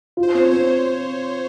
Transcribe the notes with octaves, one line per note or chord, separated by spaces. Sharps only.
F4
C5
C4 C#5
C4 C5